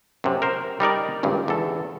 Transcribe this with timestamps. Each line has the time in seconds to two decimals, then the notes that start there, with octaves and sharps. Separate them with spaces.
0.24 F#2 C3
0.42 A#4 C5
0.80 G3 D#4 A#4 D5
1.23 G#1 C#2 G2
1.48 E2 A4